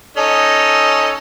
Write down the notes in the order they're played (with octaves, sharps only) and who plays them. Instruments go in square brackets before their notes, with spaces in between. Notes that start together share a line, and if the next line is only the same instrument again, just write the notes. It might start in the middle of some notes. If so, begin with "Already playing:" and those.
[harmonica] C#4 D#4 A4